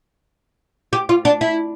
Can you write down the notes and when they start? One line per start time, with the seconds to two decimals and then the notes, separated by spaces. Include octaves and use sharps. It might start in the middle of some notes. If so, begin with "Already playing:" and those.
0.93 G4
1.09 F4
1.25 D4
1.41 E4